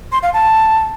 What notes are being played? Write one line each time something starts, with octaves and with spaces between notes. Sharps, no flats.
C6
F5
A5